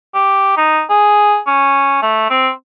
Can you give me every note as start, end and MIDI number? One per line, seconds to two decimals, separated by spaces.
0.15 0.54 67
0.57 0.82 63
0.90 1.38 68
1.47 1.99 61
2.02 2.28 57
2.31 2.49 60